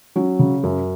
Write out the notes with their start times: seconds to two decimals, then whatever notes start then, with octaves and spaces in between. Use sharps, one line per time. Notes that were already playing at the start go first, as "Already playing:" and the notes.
0.16 F#3 C#4
0.39 C#3
0.64 F#2